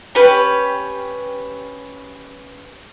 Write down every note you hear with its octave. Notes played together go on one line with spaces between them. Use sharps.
C#4 G4 B4